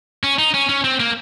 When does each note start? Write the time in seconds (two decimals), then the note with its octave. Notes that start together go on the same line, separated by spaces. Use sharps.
0.24 C#4
0.39 D#4
0.54 C#4
0.69 C#4
0.84 C4
1.00 A#3